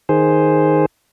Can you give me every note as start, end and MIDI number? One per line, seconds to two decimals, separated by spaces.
0.09 0.86 51
0.09 0.86 68
0.09 0.86 72